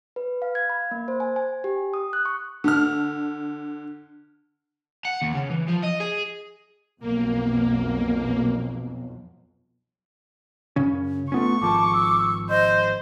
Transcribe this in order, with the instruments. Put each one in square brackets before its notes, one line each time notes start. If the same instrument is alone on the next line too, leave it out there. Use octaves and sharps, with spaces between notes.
[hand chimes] B4
F5
G#6
B5
A#3
C5
G#5
G#5
G4
D#6
F#6
C#6
[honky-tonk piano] D3 F6
[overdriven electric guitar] F#5
D#2
C#3
E3
F3
D#5
G#4
[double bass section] B1 F2 [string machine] A#3
[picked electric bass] F#2 C#3 C#4
[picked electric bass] A3 B3 C#4 [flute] F4 [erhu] C#6
[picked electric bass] G#1 F3 [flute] A5 [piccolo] D6
[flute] E6
[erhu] C5 [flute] D#5 [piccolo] G6